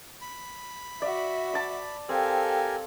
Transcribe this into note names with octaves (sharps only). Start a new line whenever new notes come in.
B5
F#4 D5 E5
A5 D6
C4 G4 A4 A#4 F5 G#5